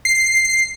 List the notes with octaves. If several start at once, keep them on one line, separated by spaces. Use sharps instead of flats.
C7